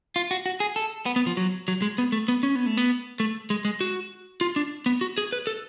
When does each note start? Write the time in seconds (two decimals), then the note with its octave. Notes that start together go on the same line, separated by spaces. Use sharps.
0.16 F4
0.31 F#4
0.46 F#4
0.60 G#4
0.76 A4
1.06 B3
1.16 B3
1.26 F3
1.37 F#3
1.68 F#3
1.82 G#3
1.98 B3
2.12 A3
2.28 B3
2.43 C#4
2.55 B3
2.66 A3
2.77 B3
3.20 A3
3.50 G#3
3.65 G#3
3.81 F#4
4.41 F4
4.56 D4
4.86 B3
5.01 F#4
5.18 G#4
5.32 B4
5.47 A4